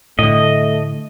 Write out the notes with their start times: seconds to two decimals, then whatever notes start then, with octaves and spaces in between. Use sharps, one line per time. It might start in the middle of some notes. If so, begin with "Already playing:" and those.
0.19 A2 D3 A3 D#5